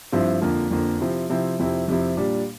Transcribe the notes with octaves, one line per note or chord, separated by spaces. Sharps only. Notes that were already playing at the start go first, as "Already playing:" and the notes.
G2 F3 C4 E4
F2 D3 F3 A#3
F2 D3 F3 A#3
C3 F3 C4 E4
C3 F3 C4 E4
F2 C3 F3 C4 E4
F2 C3 F3 C4 E4
A#2 G3 D4